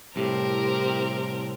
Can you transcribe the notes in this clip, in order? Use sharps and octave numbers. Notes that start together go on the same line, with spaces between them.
C2 A2 C4 G4 A#4